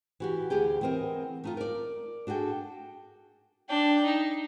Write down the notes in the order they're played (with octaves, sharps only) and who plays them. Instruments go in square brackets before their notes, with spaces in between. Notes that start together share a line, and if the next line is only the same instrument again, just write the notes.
[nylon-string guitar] E3 F#4 G4
D2 G4 G#4 G5
E3 B3 C4 A#4 D#5
A3 D#4 F4
A#4 D5
D4 F#4 G#4 A4 G5
[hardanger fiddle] D4 G5
D#4